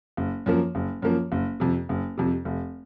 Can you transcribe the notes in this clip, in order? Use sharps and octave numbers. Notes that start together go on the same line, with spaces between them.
F#1
F#2 F3 A#3
F#1
F#2 F3 A#3
F#1
F2 C3
F#1
F2 C3
F1